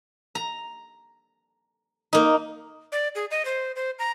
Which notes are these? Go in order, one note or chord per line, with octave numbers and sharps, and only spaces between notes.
A#5
A#3 D#4
D5
G#4
D#5
C5
C5
A#5